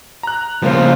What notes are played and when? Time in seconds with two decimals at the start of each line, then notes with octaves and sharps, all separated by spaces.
0.23 A#5 F#6
0.62 C#3 F3 G3 A#3 F4 C5